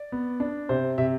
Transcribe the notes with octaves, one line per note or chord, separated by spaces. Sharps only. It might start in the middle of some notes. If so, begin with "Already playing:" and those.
Already playing: D5
B3
D4
C3 C5
C3 E5